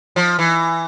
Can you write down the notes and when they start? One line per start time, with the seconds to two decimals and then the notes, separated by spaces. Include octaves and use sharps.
0.16 F3
0.39 E3